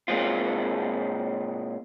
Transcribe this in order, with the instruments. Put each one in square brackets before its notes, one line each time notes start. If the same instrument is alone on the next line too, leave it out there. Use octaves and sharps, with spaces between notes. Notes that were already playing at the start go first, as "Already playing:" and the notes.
[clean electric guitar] A#2 G#3 C4 F4